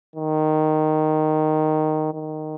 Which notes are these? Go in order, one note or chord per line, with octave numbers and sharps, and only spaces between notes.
D#3
D#3